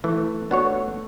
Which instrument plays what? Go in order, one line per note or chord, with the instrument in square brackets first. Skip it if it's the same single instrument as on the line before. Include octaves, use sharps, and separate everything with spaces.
[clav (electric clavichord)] E3 [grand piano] A3
[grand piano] A3 [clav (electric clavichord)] B3 D4 F#4 C#5